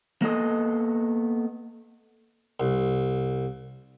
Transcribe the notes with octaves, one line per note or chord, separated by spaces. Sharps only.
A#3 B3 A4 D#5
C2